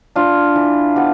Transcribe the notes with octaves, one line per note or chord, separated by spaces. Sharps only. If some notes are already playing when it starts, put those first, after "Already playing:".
D4 F4
E3
B3 G4